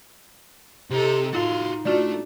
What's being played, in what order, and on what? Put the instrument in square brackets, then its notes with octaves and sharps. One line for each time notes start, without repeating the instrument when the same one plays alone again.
[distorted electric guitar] C3 [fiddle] D#4 A4 [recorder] G4
[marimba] A2 F4 A6 [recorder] D#4 [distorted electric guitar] F#4 F5 [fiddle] C6
[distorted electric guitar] A3 A4 [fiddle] D4 [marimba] F4 F#4 D5